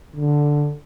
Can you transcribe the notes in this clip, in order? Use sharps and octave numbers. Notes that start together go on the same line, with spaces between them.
D3